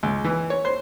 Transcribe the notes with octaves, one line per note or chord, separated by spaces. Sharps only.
C#2
E3
C#5
C5